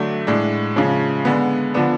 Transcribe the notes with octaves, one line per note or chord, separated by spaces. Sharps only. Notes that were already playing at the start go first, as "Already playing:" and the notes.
Already playing: D3 F#3 A3 D4
A2 G#3 D4
C#3 F3 G#3 C#4
D3 G#3 B3
D3 F3 B3 D4